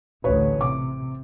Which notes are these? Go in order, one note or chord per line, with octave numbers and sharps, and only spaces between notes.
A1 D2 B4 C#5
C3 D6